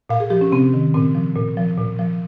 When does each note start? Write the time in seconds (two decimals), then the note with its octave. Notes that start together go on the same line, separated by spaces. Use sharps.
0.09 A#2 F5
0.20 G#4
0.30 F3 G4
0.41 C#4
0.52 C3 C4
0.74 D#3
0.94 A#2 C4
1.15 F3
1.36 A#2
1.57 F3
1.78 A#2
1.99 F3